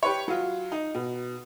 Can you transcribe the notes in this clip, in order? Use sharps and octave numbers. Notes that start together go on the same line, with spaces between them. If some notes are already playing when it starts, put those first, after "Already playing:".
G4 B4 C#5
F#3 F4
D#4
B2